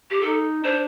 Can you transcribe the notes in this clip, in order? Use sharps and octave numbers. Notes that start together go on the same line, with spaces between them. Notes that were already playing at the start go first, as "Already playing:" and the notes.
G4
D#4 A4
D4 C5